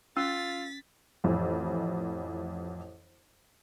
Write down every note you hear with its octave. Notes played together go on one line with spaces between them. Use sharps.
C#4 F4 E6 A6 B6
A1 F2 E3